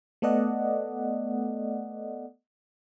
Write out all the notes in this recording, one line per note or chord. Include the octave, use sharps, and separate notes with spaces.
A3 B3 A4 D5 D#5 F#5